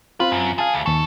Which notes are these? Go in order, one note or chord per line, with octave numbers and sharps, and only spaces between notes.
C4 F4 B4
F#2
G#4 F5 A5
D2
D#2 A4 C#6